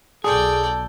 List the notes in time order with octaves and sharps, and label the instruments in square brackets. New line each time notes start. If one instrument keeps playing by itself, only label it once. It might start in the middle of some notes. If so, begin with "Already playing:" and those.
[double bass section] B1 [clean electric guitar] G#4 [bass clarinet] A4 [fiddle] D5 G5